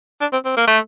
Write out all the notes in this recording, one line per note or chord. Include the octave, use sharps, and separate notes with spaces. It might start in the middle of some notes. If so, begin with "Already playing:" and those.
D4
C4
C4
A#3
A3